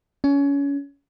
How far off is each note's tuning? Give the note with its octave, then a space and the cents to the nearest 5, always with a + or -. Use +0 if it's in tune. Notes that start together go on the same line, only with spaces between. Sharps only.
C#4 +25